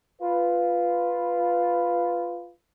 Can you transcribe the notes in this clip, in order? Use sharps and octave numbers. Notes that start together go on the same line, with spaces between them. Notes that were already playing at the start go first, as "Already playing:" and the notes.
F4 B4